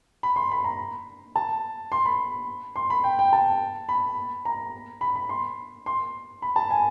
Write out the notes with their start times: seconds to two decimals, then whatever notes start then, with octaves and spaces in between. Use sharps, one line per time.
0.23 B5
0.36 C6
0.51 B5
0.64 A#5
1.36 A5
1.92 C6
2.06 B5
2.76 C6
2.90 B5
3.04 G5
3.19 G5
3.33 A5
3.89 B5
4.45 A#5
5.01 B5
5.16 B5
5.29 C6
5.86 C6
6.42 B5
6.56 A5
6.71 G#5